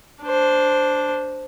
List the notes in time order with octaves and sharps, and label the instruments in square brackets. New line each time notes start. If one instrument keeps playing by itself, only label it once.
[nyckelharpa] D4 C5